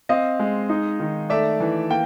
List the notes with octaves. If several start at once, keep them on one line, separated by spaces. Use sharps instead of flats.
C4 D#5 F5
G#3
D#4
D#3
A3 D5 E5
E3
A#3 G5